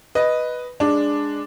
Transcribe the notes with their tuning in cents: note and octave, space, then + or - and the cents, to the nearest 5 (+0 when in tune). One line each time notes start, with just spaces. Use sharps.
B4 +0 D#5 +0
G#3 -10 D4 +0